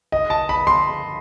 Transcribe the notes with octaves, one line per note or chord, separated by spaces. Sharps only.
D#5
A5
B5
C6